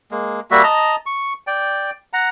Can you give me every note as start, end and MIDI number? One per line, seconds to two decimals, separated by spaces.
0.11 0.40 56
0.11 0.40 58
0.51 0.63 55
0.51 0.63 58
0.51 0.63 66
0.51 0.63 76
0.63 0.96 75
0.63 0.96 81
0.63 0.96 82
1.06 1.33 85
1.47 1.91 74
1.47 1.91 79
2.13 2.29 78
2.13 2.29 82